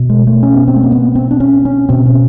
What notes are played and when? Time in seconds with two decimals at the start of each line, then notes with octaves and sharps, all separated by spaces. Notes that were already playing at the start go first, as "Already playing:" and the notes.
Already playing: B2
0.09 G#3
0.27 A3
0.43 C#4
0.55 B3
0.68 C4
0.76 A3
0.83 A#3
0.92 B3
1.15 C4
1.31 D4
1.40 C#4
1.65 C#4
1.89 B2 C4
2.06 C#4